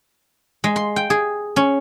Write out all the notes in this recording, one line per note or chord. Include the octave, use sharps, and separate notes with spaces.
G#3
C6
G5
G#4
C#4